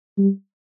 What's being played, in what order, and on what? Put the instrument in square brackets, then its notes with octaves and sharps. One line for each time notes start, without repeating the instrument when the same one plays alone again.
[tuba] G3